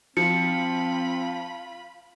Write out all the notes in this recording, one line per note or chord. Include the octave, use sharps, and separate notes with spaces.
F3 C4 F4 B5 C#7